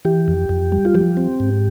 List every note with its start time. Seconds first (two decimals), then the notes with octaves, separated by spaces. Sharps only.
0.05 E3 G4
0.28 F2
0.49 F2
0.72 G3
0.85 F4
0.95 F3 G4
1.17 C4
1.40 G#2